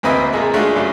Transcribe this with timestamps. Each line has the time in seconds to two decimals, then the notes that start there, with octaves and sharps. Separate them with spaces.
0.03 D2 A#3 C4 B4 D#5 E5
0.33 A#2 G#3 A#3
0.53 G#3 A3 D4 F4 F#4
0.76 G2 C#3 F#3